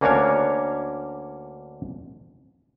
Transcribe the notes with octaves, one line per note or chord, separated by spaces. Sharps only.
D2 A#3 C#4 D4 A#4 C#5